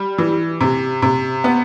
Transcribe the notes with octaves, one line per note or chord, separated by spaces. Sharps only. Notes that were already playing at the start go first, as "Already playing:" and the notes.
Already playing: G3
E3
C3
C3
B3